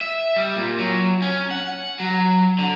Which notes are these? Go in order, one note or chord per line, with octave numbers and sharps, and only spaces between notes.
E5
G3
A#2
F#3
C#4
F#5
F#3
D3